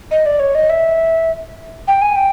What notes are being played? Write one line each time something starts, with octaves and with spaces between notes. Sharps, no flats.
D#5
D5
C#5
D#5
E5
G5
G#5
G5